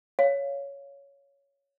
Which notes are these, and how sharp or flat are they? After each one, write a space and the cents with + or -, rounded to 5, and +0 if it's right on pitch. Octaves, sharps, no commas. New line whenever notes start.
C#5 +10 F5 -10